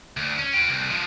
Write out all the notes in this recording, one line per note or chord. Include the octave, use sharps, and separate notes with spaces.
D2
C#4
F4 G5
C2
F3 G#3